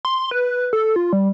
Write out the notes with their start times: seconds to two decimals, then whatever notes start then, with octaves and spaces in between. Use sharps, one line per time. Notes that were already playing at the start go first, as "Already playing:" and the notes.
0.05 C6
0.31 B4
0.73 A4
0.96 F4
1.13 G3